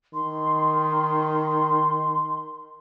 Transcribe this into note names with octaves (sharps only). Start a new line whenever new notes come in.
D#3 C6